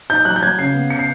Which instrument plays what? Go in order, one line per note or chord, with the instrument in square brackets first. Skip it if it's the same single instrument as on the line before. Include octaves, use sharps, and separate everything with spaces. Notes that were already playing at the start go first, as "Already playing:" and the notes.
[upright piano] D#4 G6
F#3 F#6
G6
F#3 G#6
C#3 C7
B3
C#3 C#7
C7